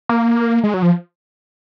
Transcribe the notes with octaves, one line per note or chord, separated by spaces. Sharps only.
A#3
G#3
F#3
F3